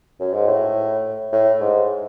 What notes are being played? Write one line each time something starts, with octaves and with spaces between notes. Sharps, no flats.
F#2
G#2
A2
A2
G#2